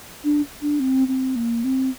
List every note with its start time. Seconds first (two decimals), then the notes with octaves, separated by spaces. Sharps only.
0.24 D4
0.62 D4
0.80 C4
1.08 C4
1.36 A#3
1.64 C4